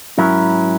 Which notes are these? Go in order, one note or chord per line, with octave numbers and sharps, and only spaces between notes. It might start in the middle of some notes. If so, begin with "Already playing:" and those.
G#2 F#3 C#4 E4 A#4